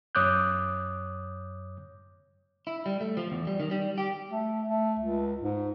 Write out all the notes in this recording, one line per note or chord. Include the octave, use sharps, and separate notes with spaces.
F#2 C#5 D6 D#6 F#6 G6
E4
G3
A3
F3
E2
G3
D#3
G3
G4
A3
A3
C#2
G#2